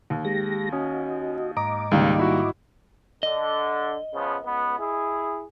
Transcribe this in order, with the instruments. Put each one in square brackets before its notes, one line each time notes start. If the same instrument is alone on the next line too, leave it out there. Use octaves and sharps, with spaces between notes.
[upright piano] D#2
[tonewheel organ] G#3 G4 A#6
[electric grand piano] C#4 [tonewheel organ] F#4 D#5
[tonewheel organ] G#2 D#5 D6 [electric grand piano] A#5
[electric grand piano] C#2 [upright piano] D#3 G3 A#3
[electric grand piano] E4 F#4
[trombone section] D3 [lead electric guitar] D#5
[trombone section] C#3 F3 B3
C#2 B3
E4 G#4